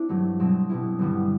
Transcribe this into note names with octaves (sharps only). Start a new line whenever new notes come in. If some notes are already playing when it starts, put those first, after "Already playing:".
Already playing: C4 D4 E4
G2 F#3 A3
B2 F#3 C4
B2 G3 B3 E4
G2 D3 G3 B3 F#4